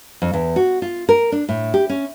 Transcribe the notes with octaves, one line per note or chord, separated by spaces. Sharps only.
F2
E2
F#4
F4
A#4
D4
A2
G4
C#4